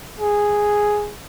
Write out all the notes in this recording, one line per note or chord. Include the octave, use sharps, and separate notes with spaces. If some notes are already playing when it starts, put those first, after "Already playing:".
G#4